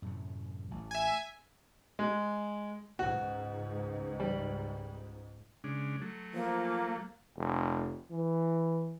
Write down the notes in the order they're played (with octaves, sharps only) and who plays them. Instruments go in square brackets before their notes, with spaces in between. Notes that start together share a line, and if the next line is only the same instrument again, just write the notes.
[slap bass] F#2 A2 C3
A1
[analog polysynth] E5 G#5
[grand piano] G#3
[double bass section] C#2 G#2 [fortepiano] F#4
[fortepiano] G3
[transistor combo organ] C#3 G#3 D4
F#3 A3
[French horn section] F3 [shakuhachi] A#3
[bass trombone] F1
E3